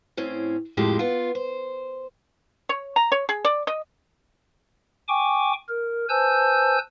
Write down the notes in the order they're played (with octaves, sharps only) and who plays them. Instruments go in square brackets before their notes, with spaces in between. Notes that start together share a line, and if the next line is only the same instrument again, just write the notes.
[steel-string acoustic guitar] A2 C4 C#4
F2 A2 F3 G#3 G4
B3 F4
C5
[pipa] C#5
A#5
C#5
G#4
D5
D#5
[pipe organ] G5 G#5 C#6 D6
A#4
B4 C5 G#5 A5 E6 G6